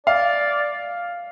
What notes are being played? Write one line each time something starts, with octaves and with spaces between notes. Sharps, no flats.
D5 F5